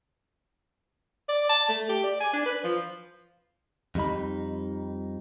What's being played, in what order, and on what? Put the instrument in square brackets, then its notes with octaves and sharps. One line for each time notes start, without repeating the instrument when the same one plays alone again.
[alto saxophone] D5
A5
A3
G4
D5
G#5
D4
B4
F3
[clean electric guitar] F2 G3 D#4 B5